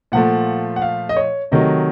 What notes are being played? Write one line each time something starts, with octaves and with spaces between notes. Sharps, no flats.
A#2 F3 A3 F#5
F#5
F5
D#5
C#5
C3 D#3 F#3 A3 D#5